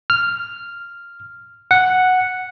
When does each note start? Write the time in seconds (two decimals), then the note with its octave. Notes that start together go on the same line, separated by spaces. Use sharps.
0.10 F6
1.71 F#5